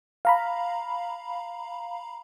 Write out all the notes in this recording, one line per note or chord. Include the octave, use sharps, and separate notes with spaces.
F5 A#5 B5